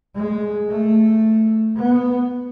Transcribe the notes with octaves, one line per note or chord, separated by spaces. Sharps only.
G#3
A3
B3